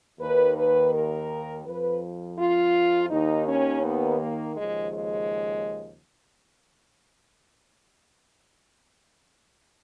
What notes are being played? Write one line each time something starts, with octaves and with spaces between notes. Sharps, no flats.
D#2 D#3 B4
B4
A#4
F2 F3 B4
F4
D#2 D#3 D#4
C#4
B3
A#3
D#2 C#3 F3 G#3
G#3